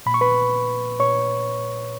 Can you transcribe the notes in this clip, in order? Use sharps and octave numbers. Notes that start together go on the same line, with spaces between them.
A#2 B5
C#6
B4 B5
A#2 C#5 C#6